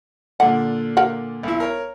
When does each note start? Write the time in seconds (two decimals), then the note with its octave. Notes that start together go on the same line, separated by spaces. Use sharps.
0.40 A#2 D3 F#5
0.97 A#4 F5 F#5
1.43 B1 E4
1.60 A#4 C#5